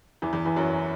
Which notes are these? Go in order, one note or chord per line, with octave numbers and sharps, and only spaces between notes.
E2 E3
E2 E3
E2 E3
F#2 F#3